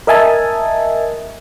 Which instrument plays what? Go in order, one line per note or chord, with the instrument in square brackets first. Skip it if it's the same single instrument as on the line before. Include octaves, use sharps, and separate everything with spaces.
[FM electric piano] A#4 D#5 E5 G#5 A5